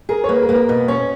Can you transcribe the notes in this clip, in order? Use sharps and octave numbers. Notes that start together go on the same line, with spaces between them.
G#4 A#4
C#5
A#3 B4
A#4
A#3 B4
A#4
B2 B4
C#4 C#5